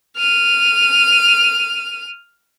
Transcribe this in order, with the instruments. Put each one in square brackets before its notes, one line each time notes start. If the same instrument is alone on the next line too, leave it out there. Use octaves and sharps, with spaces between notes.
[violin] F6 D#7